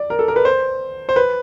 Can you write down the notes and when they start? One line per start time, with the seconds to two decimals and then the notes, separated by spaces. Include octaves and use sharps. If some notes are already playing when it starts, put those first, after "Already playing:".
Already playing: D5
0.10 A#4
0.19 A4
0.28 A#4
0.36 B4
0.45 C5
1.09 C5
1.16 B4